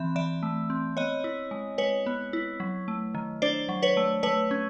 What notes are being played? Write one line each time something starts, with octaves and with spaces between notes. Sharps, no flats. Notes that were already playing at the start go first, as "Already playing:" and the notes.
Already playing: E3 C4 E5
E3 D5 E5
A3
C4
B3 C#5 D#5
E4
G#3
G#3 B4 C#5
B3
E4
F#3
A3
D#3
D4 C5 D5
F#3
B4 C#5
A3
A3 B4 C#5
C#4